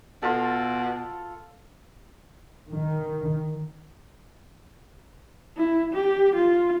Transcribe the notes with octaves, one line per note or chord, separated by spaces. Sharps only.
B2 F4 A4
D#3
E4
G4
F4